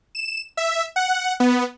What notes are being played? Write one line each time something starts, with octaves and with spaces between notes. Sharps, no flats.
E7
E5
F#5
B3